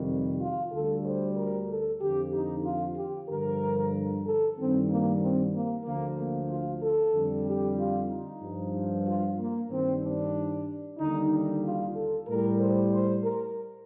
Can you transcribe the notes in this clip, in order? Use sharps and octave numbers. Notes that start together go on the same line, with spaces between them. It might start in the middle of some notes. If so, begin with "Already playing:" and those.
Already playing: F2 C3 D#3 G3
F4
D2 D3 G3 A4
C5
A#4
A4
F2 D3 F3 G4
D#4
F4
G4
G2 D3 F3 A#4
A4
G2 D#3 G3 C4
A#3
C4
A#3
D2 D3 F3 A#3
A#3
F4
A4
F2 D3 G3
G4
F4
D#4
G2 F3
F4
A#3
G2 D#3 G3 C4
D4
D#2 D3 G3 D#4
D#4
F4
A4
A2 G3 A#4
C5
C5
A#4